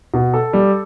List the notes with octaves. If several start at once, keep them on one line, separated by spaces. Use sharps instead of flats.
B2
A4
G3